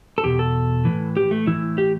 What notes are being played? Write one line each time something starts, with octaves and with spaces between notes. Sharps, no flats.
A4
E2 B2 G4
A4
A2 E3
G4
A3
A2 E3 E4
G4